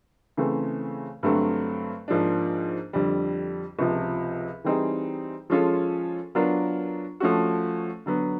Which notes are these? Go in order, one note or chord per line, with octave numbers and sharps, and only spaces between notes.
C#3 E3 A3 C4
G2 D3 F#3 A3 C4
G#2 F3 A#3 D4
F2 D3 G3
C#2 C3 F3
E3 G3 C4 D#4 G#4
F3 G#3 C#4 F4 A4
F#3 B3 D4 F4 A#4
F3 A3 C#4 F#4
D3 F#3 B3